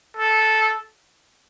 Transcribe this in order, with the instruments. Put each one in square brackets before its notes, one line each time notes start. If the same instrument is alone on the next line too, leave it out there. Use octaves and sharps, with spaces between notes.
[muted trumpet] A4